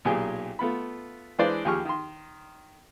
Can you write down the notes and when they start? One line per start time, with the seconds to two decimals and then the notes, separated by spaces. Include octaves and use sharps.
0.05 B1 A#2 G4 G#4 G5 G#5
0.59 A3 B3 F4 B5
1.39 E3 G#3 D4 B4 C5 D5
1.65 D#2 F3 G4 G#4 C#6 F6
1.85 D#3 C6